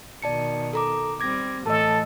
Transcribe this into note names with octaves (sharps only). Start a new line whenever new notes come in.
B2 D#3 D5 A5 C#7
A4 A#5 D6
G3 C4 D6 G#6 A#6
A2 E3 A3 A4 D#5 A5